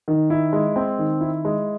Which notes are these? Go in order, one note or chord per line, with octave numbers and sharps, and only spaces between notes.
D#3
E4
G#3
C4
D#3
E4
G#3